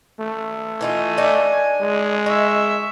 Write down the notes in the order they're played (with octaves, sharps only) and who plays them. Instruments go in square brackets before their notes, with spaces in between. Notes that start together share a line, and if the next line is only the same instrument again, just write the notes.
[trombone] A3
[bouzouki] E3 D#4 F4 [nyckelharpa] G#5
[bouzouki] D4 D#4
[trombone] G#3
[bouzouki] D#4 [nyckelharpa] E5 C#6